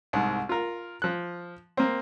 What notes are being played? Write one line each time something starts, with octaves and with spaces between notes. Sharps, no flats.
C2 G#2
F4 A#4
F3 F#6
A#3 C4